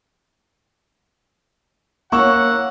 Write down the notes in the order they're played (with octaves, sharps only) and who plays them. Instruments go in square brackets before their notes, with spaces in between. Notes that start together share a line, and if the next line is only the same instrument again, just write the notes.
[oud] F#3 C#4 E4 [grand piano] A#3 C#6 E6 [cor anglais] F#5